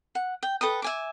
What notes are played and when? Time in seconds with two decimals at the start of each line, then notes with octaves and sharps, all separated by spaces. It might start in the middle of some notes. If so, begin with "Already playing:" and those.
0.15 F#5
0.43 G5
0.61 A4 B4 G5 D#6
0.82 E5 G#5 D6